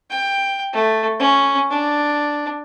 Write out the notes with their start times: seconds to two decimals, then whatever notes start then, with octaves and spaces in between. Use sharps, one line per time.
0.10 G5
0.73 A3
1.19 C#4
1.70 D4